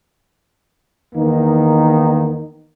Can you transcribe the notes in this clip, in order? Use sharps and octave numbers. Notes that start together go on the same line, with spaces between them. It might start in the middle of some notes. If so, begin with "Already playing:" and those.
E2 D#3 A#3 B3 D#4